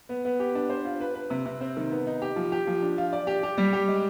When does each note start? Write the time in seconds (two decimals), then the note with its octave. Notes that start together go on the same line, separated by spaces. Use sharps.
0.09 B3
0.25 B3
0.40 G4
0.55 D4
0.70 C5
0.85 F4
1.01 B4
1.15 B4
1.30 C3
1.46 C3
1.61 C4
1.77 D#3
1.91 B3
2.07 D#4
2.22 G4
2.36 F3
2.52 G4
2.67 F3
2.82 D4
2.98 F4
3.13 D5
3.27 G4
3.43 G4
3.58 G3
3.73 G4
3.88 G#3